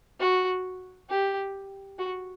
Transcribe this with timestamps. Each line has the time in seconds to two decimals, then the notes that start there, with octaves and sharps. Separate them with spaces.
0.20 F#4
1.09 G4
1.99 F#4